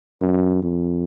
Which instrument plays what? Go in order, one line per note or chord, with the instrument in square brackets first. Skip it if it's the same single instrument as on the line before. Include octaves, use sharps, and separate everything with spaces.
[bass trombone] F#2
F2